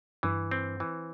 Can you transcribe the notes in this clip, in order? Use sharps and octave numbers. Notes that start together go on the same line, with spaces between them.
G2 E3
C4
E3